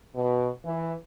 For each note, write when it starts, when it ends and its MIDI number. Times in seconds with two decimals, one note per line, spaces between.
0.15 0.48 47
0.64 0.92 52